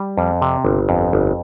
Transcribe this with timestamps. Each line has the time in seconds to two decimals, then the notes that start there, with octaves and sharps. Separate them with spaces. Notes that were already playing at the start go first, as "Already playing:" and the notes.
Already playing: G3
0.17 F2
0.42 C3
0.65 G1
0.89 F2
1.13 G1